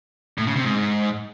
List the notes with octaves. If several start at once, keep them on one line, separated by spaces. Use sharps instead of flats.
A2
C#3
C3
G#2